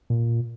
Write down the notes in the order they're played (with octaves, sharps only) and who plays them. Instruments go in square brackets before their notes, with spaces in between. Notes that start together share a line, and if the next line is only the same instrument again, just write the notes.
[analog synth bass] A#2